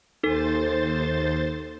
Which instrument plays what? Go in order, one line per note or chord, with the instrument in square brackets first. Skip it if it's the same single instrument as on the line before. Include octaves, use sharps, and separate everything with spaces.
[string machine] D#2 C5 A6 [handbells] D#4 A4